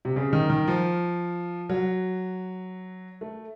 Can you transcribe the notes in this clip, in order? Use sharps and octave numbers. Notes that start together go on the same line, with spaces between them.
C3
C#3
D#3
D#3
F3
F#3
A3